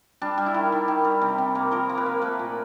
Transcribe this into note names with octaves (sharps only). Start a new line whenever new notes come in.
G3 D4
G3
E4
D#3
D#3
D#3
G3
C3
C3
A#3
F3 A#4
A#3
B4
A#3
A3 B4
A#2